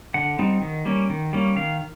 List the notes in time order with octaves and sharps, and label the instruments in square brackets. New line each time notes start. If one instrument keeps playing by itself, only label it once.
[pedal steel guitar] D3 F#5
G3 C4 D#4
D#3
G3 A#3 C#4
D#3
G3 A#3 C#4
D#3 F5